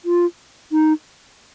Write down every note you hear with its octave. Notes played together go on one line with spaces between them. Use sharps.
F4
D#4